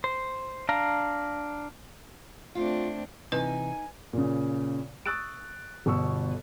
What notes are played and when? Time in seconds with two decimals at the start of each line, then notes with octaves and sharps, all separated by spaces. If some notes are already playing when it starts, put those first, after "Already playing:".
0.04 C5
0.69 D4 F5 A#5
2.55 A3 C4 D4 F4
3.32 C3 E3 D#4 B4 G#5
4.13 A#2 C#3
5.06 C#6 D#6 E6 F#6 A6 D7
5.86 G1 B2 C#6 E6